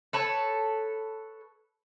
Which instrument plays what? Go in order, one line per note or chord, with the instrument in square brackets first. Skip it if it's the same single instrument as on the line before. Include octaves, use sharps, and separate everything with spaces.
[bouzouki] A4 B4 C#5